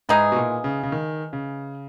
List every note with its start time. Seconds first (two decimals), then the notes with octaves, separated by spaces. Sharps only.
0.09 G#2 E3 G#3 D#4 G#4
0.32 B2
0.36 A#2
0.64 C#3
0.83 C#3
0.92 D#3
1.33 C#3